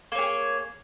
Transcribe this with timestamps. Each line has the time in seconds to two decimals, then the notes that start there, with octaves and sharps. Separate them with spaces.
0.12 A#3
0.15 C#5
0.18 G#4